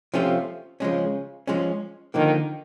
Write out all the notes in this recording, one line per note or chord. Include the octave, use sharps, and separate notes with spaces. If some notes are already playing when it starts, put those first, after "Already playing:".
C3 F3 A3 C#4 F4
C#3 F3 G#3 C#4
F3 G#3 C#4
D3 D#3 F3 A#3